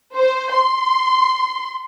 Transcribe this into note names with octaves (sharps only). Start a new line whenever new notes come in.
C5
C6